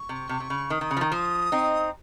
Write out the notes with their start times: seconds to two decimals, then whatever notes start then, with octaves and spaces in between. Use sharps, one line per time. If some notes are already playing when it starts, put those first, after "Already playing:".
Already playing: C#6
0.09 C3
0.29 C3
0.40 C3
0.50 C#3
0.70 D#3 D#6
0.81 D#3
0.91 C#3
0.97 F3
1.01 D#3
1.12 F3 D#6
1.52 C4 D#4